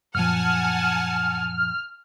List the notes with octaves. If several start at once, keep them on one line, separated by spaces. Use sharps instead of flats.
F#2 A#2 F3 F#5 G#5 A5 F6